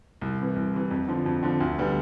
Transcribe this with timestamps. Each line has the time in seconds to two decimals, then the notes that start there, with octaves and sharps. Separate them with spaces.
0.21 C2
0.39 C3 E3
0.56 C2
0.74 C3 E3
0.91 F2
1.08 D3 F3
1.26 F2
1.43 D3 F3
1.60 D2
1.78 D3 G3 B3